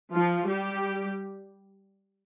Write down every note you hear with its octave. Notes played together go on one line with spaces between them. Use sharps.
F3 F4
G3 G4